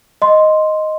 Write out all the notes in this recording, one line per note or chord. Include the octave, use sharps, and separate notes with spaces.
D#5 C6